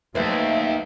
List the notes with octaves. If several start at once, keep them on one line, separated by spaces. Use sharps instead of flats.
D#2 F#3 A3 B4 C5 E5